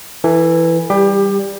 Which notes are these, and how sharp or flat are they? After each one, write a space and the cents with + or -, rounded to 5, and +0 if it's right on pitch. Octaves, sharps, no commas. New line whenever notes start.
E3 +5 A4 +40
G3 +0 G4 +25